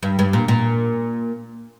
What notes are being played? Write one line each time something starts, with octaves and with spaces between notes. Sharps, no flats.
G2
G2
A#2
A#2